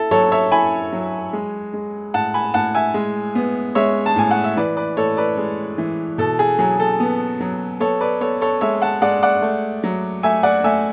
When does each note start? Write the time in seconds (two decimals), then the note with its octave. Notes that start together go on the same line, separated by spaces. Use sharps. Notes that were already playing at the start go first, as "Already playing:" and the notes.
Already playing: E4 A4
0.11 F#3 A4 C#5
0.32 C#5 E5
0.52 E4 G#5 B5
0.93 F#3
1.33 G#3
1.74 G#3
2.14 A2 F#5 A5
2.34 G#5 B5
2.54 A2 F#5 A5
2.75 E5 G#5
2.94 G#3
3.35 B3
3.75 G#3 C#5 E5
4.06 A5
4.16 A2 G#5
4.31 F#5
4.44 E5
4.57 E3 B4 D5
4.77 B4 D5
4.97 A2 A4 C#5
5.17 B4 D5
5.37 G#3
5.78 E3
6.18 B2 A4
6.39 G#4
6.59 F#3 G#4
6.80 A4
7.00 B3
7.40 F#3
7.80 B3 A4 C#5
8.01 B4 D5
8.21 B3 A4 C#5
8.41 A4 C#5
8.61 G#3 C#5 E5
8.82 F#5 A5
9.02 G#3 D5 F#5
9.22 D5 F#5
9.42 A3
9.84 F#3
10.23 A3 E5 G#5
10.43 D5 F#5
10.64 A3 E5 G#5